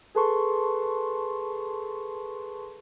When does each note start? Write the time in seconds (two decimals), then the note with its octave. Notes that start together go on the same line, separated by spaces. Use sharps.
0.15 G#4 A4 B4 A5 C6 C#6